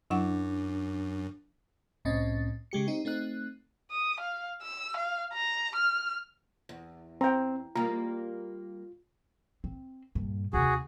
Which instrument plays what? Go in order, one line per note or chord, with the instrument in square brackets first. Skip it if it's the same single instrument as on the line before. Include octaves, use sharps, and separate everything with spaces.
[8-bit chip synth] F#2 [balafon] F#3 E4 F#5 [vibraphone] D4
[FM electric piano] C2 A2 C4 C#4 D#5 A6
C#3 G#3 G4 C#7
C4 D#4 G4
A3 C4 D#4 F#6
[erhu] D#6
F5
E6
F5
A#5
F6
[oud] E2
[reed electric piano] C4 [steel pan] G5 A#5
[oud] G3 A#3 [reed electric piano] F4 [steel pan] A#5
[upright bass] C4
G2 A#2
[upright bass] D#2 C3 [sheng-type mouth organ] F#4 G#4